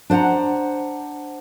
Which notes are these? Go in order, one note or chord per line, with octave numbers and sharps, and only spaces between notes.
D4 C5 F5 F#5 A#5